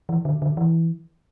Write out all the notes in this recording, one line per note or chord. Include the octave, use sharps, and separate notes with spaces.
E3
D3
D3
E3